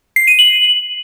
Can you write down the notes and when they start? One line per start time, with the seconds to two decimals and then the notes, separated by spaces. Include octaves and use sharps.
0.16 C7
0.27 D#7
0.39 F#7